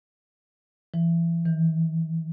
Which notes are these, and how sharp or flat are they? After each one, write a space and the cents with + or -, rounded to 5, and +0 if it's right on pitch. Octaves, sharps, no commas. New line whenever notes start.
E3 +30
E3 -35